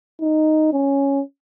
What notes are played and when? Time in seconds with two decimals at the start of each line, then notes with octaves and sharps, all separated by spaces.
0.21 D#4
0.73 C#4